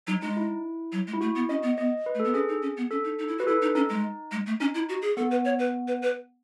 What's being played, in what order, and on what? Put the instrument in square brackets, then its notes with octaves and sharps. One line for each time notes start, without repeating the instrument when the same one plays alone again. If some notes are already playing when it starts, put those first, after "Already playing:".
[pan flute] F#3 [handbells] D#4
[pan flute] G#3 [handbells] D#4
[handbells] E4
[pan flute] F#3
G#3
[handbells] E4
[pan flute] A3 [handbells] F#4
[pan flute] B3
[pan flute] C#4 [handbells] D#5
[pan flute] B3
[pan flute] B3 [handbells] D#5
[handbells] B4
[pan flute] A3
[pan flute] B3 [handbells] A4
[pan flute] C#4 [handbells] G#4
[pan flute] D#4
C#4
B3
[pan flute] C#4 [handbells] A4
[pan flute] D#4
D#4
E4
[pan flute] F#4 [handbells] B4
[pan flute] E4 [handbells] A4
[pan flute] D#4
[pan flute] C#4 [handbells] D#4
[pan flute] G#3
G#3
A3
[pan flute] C#4 [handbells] D#4
[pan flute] E4
F#4
G#4
[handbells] B3 [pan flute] A4
[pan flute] B4
C#5
B4
B4
B4